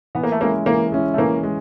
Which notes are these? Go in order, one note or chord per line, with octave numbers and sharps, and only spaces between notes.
E3 B3
A#3
A3
G#3 A#3 C#4 E4
E3 A#3
G#3 C#4 E4
A3
E3 A#3
G#3